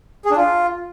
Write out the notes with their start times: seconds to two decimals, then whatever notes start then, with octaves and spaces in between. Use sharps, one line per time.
0.25 G#4
0.31 D4
0.36 F4